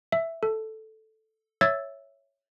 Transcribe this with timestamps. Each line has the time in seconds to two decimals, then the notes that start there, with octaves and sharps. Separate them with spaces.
0.12 E5
0.43 A4
1.61 C#5 E5 E6 G#6 A6